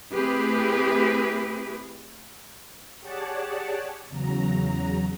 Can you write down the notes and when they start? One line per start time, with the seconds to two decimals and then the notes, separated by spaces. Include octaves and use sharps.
0.13 A3 C4 E4 G4 G#4 B4
3.00 G4 G#4 C#5 D5 F#5 A5
4.08 E2 C#3 F#3 A#5